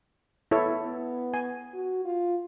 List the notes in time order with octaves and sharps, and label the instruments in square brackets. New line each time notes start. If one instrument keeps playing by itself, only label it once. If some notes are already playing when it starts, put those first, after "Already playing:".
[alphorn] B3 [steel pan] E4 A4 C#5
[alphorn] B3
[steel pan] G#5
[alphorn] F#4
F4